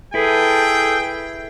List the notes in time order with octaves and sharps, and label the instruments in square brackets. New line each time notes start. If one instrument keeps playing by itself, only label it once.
[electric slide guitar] E4 B4 [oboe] G#4 [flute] A4 [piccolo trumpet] G5